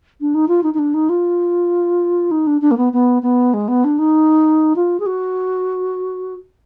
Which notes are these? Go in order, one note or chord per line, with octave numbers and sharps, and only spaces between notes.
D4
D#4
F4
D#4
D#4
D4
D#4
F4
D#4
D4
D4
A#3
B3
B3
B3
G#3
B3
D4
D#4
F4
G#4
F#4